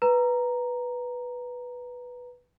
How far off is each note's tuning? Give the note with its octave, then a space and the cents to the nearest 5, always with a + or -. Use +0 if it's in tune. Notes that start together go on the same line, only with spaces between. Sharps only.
B4 -5 A#5 +0